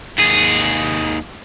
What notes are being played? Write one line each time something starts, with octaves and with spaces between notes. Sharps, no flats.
D#2 G#4